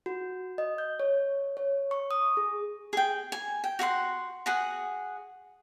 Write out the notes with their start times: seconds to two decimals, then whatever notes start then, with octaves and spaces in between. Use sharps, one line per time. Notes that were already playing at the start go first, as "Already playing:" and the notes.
0.06 F#4
0.58 D#5
0.78 G6
1.00 C#5
1.57 C#5
1.91 C#6
2.11 D#6
2.37 G#4
2.93 G#4 G5
3.32 G#5
3.64 G5
3.79 F#4 F#5 A5 C6
4.46 F#4 G#4 F#5